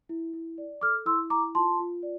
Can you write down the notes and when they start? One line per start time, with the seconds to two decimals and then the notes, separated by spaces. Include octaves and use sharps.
0.09 E4
0.33 E4
0.58 D5
0.81 A4 D6 F6
1.06 E4 C6 E6
1.30 E4 A#5 D6
1.55 F4 A5 C6
1.80 F4
2.03 D5